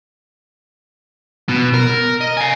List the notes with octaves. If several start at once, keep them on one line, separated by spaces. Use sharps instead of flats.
B2
A#4
D#5
F5 G#5